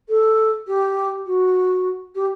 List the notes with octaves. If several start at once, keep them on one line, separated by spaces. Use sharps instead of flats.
A4
G4
F#4
G4